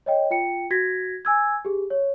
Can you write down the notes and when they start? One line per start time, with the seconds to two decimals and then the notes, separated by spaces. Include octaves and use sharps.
0.06 C#5 D#5 G5
0.31 F4 G5 C#7
0.71 F#4 G#6 A#6 B6
1.25 G#5 E6 G#6
1.65 G4 G#4
1.90 C#5